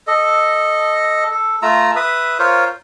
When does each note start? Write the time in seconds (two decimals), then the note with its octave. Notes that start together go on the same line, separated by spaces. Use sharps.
0.07 A4 D#5
1.31 A4
1.62 A3 F4 A#5 E6
1.96 B4 E5 D#6
2.39 F4 A#4 C5 C#5